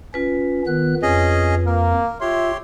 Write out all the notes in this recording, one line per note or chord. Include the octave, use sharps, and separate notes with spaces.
C#4 F4 B4
D#3 B3 F#6
F2 C#4 G#4 D#5
A#3 A#4
F4 G4 C#5 E5 C6